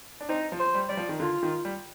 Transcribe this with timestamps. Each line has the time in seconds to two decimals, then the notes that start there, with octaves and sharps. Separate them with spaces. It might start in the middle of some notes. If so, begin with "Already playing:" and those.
0.21 D4
0.29 C4 D#4
0.52 F3
0.59 C5
0.74 G3
0.89 G3 D5
0.97 F3
1.09 D#3
1.20 D3 F4
1.43 D#3
1.65 G3